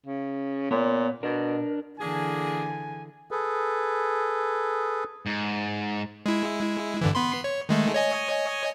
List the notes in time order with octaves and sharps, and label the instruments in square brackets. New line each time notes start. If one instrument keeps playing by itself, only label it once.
[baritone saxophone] C#3
[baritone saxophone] A#2 [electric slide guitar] B3 C#5
[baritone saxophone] B2 [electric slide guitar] D4 A#4
[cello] D3 E3 [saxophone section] A#3 D4 G#4 [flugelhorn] G#5
[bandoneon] G#4 A4 B4
[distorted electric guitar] G#2
[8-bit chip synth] G#3 E4
G2 D3 E3
B3 B5 C6
C#5
D#3 G#3 A3
C#5 D#5 G#5